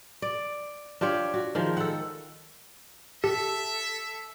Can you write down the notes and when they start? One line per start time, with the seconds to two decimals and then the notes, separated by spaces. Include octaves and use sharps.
0.22 D5
1.01 D4 F4 G4 C#5
1.34 F#4
1.55 D#3 F3 G#3
1.77 A4 F#5
3.24 G4 A4 E5